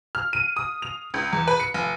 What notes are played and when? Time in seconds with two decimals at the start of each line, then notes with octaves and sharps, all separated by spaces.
0.15 F6
0.33 D#7
0.57 D#6
0.82 F7
1.14 C#2
1.33 E2
1.48 B4
1.60 C#7
1.74 F1